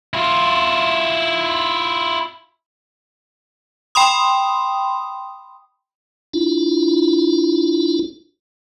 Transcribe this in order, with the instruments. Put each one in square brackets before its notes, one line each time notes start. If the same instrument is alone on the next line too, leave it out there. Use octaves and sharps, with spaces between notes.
[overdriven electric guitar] E4 F4
[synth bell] G5 B5 C6 D#6
[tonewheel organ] D4 E4 F4